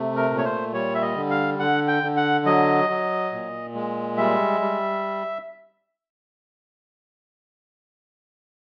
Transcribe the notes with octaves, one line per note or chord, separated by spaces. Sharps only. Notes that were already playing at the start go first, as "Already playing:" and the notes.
Already playing: C3 A3
A#4
A#2
C#5
C5
G3 C#5
E5
D#5
D3
F5
D3 F#5
G5
D3
F#5
F#3 D#5
F#3
A#2
G#3
G3 E5
G3